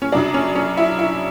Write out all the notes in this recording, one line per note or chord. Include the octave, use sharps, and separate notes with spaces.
C#4
F#2 C#3 F#3 D4
C#4
C#4
E4
E4